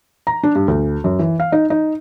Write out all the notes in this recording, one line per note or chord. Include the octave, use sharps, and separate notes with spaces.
A#5
D4
G2
D2
F#2
E3
F5
D#4
D#4